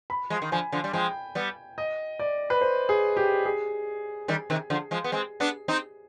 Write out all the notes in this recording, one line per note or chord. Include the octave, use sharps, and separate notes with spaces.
B5
F3 G#3
D#3
D3 F3 G#5
D3 F3
G3
F3 G#3 G5
G3 B3
D#5
D5
B4
C5
G#4
G4
G#4
D#3 G3
C3 D#3
D3 F3
F3 G#3
B3
G#3 C4
B3 D4
C4 D#4